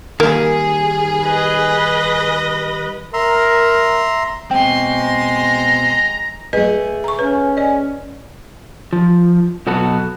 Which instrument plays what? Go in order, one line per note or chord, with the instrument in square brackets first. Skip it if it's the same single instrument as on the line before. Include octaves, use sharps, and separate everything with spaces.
[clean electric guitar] D#3 G3 [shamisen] A#3 [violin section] G#4
[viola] B4 D#5
[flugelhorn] A#4 [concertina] E5 A#5 C6
[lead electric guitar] B2 C4 [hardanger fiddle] G#3 C6 [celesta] G5
[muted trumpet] A#5
[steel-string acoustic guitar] A3 G#4 [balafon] B4 D#5
[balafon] A#5 C#6
[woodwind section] C#4 [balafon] B4
[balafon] D5 D#5
[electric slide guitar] F3
B2 F#3 B3 F#4 A4 B4